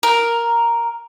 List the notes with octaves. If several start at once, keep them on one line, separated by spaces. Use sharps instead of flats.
A#4